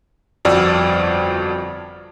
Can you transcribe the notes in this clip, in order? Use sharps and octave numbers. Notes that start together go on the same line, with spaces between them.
G1 F2 F#4 D5 E6 F6